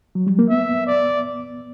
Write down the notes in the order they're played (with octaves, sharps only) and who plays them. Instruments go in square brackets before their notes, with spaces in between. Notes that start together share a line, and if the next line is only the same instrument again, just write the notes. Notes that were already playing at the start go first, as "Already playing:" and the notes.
[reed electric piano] F#3
G3
A#3
[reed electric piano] B3 [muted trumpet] E5
[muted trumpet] D5